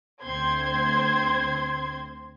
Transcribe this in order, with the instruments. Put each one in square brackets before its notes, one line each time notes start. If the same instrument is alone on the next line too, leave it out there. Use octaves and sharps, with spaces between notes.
[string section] D2 C4 C5 C6 G#6